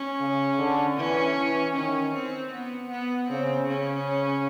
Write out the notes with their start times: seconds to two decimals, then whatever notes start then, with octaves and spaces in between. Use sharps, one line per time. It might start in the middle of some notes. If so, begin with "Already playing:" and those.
Already playing: C#4
0.20 C#3
0.59 D3
0.97 E3 C#4
1.36 E3
1.75 D#3 C#4
2.14 C4
2.52 B3
2.91 B3
3.29 C#3 C4
3.68 C#3 C#4